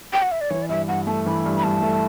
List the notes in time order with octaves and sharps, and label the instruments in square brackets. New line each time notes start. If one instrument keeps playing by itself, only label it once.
[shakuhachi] G5
F#5
E5
D5
[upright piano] E3 [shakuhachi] C#5
[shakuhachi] D5
[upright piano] G2 [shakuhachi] E5
[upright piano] G2 [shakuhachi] F#5
[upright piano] A3 [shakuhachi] A5
[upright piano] E3 [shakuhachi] B5
[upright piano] G2
[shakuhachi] B5
[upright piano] G2 [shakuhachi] A5
[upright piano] A3